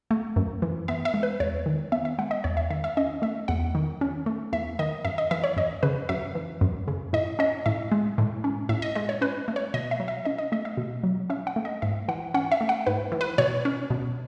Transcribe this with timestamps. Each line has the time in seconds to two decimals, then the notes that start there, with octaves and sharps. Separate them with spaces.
0.11 A3
0.36 F#2
0.62 E3
0.88 B3 E5
1.05 E5
1.14 G#3
1.23 B4
1.40 E2 C#5
1.66 D#3
1.92 B3 E5
2.05 E5
2.19 G#3 F#5
2.31 D#5
2.44 E2 C#5
2.57 E5
2.70 D#3 E5
2.84 E5
2.97 C#4 D#5
3.22 A3 E5
3.48 E2 F#5
3.75 D#3
4.01 C#4
4.26 A3
4.53 E2 E5
4.79 D#3 D#5
5.05 F#2 E5
5.18 D#5
5.31 E3 E5
5.44 C#5
5.56 F#2 D#5
5.83 C#3 B4
6.09 F#2 E5
6.35 E3
6.61 F#2
6.88 C#3
7.13 A2 D#5
7.39 C#4 D#5
7.66 A2 E5
7.92 G#3
8.18 A2
8.44 C#4
8.69 A2 E5
8.82 D#5
8.95 G#3 D#5
9.09 C#5
9.21 C#4 B4
9.48 A3
9.56 C#5
9.74 B2 D#5
9.91 E5
10.00 F#3
10.08 E5
10.25 C#4 D#5
10.38 D#5
10.52 A3 D#5
10.65 E5
10.77 B2
11.03 F#3
11.30 C#4 E5
11.47 F#5
11.56 A3
11.65 D#5
11.82 G#2 E5
12.08 E3 F#5
12.34 C#4 F#5
12.52 E5
12.61 A3
12.69 F#5
12.87 G#2 B4
13.12 E3
13.21 B4
13.38 B2 C#5
13.65 C#4
13.90 B2